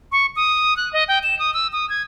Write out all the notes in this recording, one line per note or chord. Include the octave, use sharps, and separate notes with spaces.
C#6
D#6
F#6
D#5
G5
E7
D#6
E6
D#6
G#6